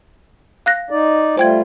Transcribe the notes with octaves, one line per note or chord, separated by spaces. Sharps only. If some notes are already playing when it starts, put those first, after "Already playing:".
F5 F#6 A#6
D#4 D5
G3 A3 F4 C5 G5 G#6